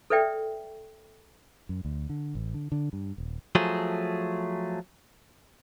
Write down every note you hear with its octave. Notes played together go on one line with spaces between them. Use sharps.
A4 B4 D5 E5 G5
F#2
D2
D3
A1
D3
D3
G2
D#1
F3 F#3 A3 G#4